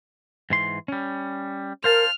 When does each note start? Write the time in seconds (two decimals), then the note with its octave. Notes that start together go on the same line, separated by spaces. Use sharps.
0.50 G#2 E3 C6
0.88 G3 C#4
1.84 A#4 C5 F5 A5 F6